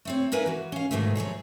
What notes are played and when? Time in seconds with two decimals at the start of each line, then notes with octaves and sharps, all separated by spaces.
0.05 A3 C4 C#5
0.32 A#3 D#4 A#4 B4 E5 G#5
0.46 E3 F#4
0.72 C#4 F5
0.91 G#2 B2 D#3 E3 A3
1.16 F3 F#3 G#4 C#5